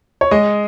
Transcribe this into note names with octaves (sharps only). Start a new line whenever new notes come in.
C#5
G#3 D#5